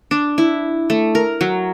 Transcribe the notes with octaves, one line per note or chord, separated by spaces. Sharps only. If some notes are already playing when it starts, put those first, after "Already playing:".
D4
E4
A3
A#4
F#3